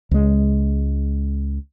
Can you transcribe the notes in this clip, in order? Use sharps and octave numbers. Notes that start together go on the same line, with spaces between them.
C#2 G#3